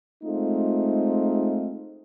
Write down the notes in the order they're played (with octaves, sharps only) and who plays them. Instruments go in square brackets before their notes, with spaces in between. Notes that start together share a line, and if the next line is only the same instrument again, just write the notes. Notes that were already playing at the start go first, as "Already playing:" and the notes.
[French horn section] G#3 A3 C4 D#4 F4